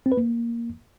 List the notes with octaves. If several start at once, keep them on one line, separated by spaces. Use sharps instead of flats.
C4
B4
A#3